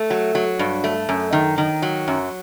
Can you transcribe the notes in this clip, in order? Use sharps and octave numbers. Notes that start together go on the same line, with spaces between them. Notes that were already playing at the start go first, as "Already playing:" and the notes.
Already playing: A3
F#3
F#3
G2
A3
F#2
D#3
D#3
F#3
F#2